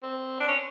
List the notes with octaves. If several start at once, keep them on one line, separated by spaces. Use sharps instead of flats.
C4
D4
C#4